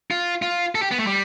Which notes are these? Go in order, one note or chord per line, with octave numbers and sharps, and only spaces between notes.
F4
F4
A4
G4
B3
A3
G3